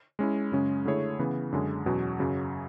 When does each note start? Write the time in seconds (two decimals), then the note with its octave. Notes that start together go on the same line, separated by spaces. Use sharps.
0.19 G#3 C#4 E4
0.52 F#2 C#3 G#3 C#4
0.85 D3 A3 E4 G#4 C#5
1.19 C#3 E3 B3
1.52 F#2 D3 G#3 C#4
1.86 E2 B2 F#3 C#4
2.20 F#2 C#3 F#3